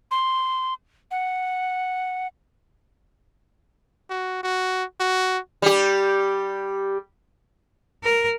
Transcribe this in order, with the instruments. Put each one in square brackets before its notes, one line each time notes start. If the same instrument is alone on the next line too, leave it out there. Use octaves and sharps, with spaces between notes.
[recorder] C6
F#5
[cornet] F#4
F#4
F#4
[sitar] G3 G4
[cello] A#4